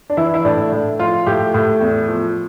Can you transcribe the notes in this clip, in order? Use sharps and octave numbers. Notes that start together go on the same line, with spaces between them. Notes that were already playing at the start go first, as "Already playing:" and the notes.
D4
E3 E4
E4
A2 D4
A2
F3 F4
A2 G4
A2
E2
F3